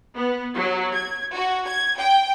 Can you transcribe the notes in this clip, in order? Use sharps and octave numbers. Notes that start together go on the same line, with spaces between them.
B3
F#3
G#6
F#4
G#6
G5